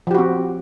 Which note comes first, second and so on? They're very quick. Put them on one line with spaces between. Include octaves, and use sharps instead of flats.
F3 G4 F#4 C4